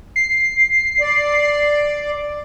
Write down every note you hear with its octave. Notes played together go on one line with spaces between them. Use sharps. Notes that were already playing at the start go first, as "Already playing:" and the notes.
C7
D5